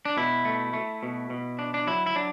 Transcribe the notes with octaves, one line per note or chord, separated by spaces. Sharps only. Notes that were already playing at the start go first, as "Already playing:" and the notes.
D4
B2 E4
A3
A3
B2
B2
D4
D4
F#3 E4
E4
F#3 D4